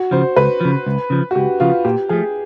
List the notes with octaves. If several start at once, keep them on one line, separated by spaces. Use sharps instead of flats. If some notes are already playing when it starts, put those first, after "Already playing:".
Already playing: F#4
C#3 F3 C5
C#2 B4
C#3 F3
C#2
C#3 F3
F#4
C#2 G4
C#3 F3 F4
A#2 G4
F3 A3 G#4